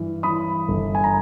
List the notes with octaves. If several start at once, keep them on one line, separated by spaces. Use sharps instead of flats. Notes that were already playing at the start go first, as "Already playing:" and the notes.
Already playing: G2 E3
E3 B5 D#6
G1
G#5
A#5